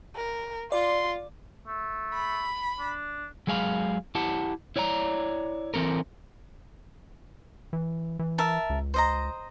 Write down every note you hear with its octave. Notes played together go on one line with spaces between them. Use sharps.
A#4
F4 D5 C6
A3
B5
D4
F#3 G#3 G#4 F5 G#5 B5
E4 G4 F#5 A5
E4 C#5 D5 E5 A#5
E3 C4 A4 A#4
E3
E3
A#4 E5 A5
C#2
C5 D#5 A#5